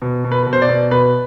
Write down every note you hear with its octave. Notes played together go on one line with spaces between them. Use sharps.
B2
B2
B4
B2 B4
C5
D5
B2
B2 B4